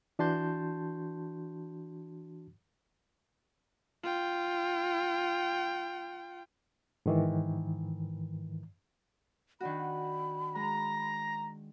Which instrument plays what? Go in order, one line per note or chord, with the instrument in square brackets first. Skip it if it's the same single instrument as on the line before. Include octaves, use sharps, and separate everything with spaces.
[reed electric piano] E3 D4 F#4 A5 C6 G6
[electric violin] F4 G5
[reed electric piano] G#2 D#3 E3
[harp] D#3 D4 F#4 [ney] B5
[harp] G#3 [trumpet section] A#5